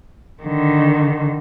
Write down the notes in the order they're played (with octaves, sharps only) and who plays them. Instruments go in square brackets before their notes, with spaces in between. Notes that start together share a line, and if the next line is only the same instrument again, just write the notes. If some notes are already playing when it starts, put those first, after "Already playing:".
[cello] D3 D#3